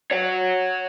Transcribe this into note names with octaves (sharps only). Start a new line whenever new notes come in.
C#5 F#5